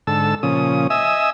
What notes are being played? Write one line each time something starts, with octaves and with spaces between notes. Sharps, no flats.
G#2 D3 A4 A5 E6
A#2 C#3 F3 C#4 D#6
D#5 E5 G#5 D#6 E6